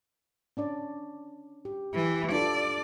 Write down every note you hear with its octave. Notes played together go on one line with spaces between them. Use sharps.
C#4 D4 D5
G4
E3 G4
D4 F4 A4 D5